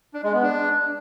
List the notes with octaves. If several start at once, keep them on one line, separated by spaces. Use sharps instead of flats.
D4
G#3
B3
D4